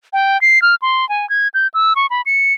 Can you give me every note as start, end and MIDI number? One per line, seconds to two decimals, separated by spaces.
0.13 0.40 79
0.41 0.62 96
0.62 0.75 89
0.82 1.08 84
1.09 1.28 80
1.30 1.48 92
1.54 1.67 91
1.74 1.93 88
1.96 2.06 85
2.10 2.22 83
2.26 2.53 97